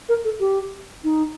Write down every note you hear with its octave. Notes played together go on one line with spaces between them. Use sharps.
A#4
A4
G4
D#4